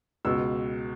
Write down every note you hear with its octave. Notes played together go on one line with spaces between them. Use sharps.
C#2 B2 E6